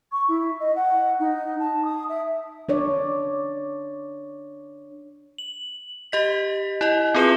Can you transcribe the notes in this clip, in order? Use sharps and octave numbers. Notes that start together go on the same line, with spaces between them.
C#6
E4
D#5
F#5
D#4
A5
D#6
E5
D4 C#5 D5
F#7
G4 D#5 B6
E4 D#5
C4 F4 G#4 B4 E7 G7